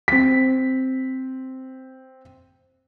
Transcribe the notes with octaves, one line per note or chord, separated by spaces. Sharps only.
C4 B6